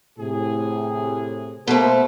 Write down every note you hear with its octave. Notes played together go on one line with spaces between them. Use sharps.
A2 C3 G#4
B2 A3 A#3 A4 C5